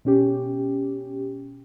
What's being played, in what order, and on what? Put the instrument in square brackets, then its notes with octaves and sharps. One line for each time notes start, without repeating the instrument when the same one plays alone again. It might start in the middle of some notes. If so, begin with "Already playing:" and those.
[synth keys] B2 C#4 G4